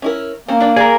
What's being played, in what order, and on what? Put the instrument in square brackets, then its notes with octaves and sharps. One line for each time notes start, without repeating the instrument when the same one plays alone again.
[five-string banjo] C#4 E4 A#4
[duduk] A#3 [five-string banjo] C4 C#4
[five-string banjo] D4 D5
[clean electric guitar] G#4 A#4 [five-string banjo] D5